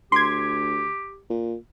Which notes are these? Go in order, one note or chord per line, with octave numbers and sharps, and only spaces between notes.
D2 G4 C6 G#6
A#2